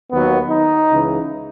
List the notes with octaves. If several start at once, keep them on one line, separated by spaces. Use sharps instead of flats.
D#2 D#3 F#3 B3
D#4
C#2 C#3 E3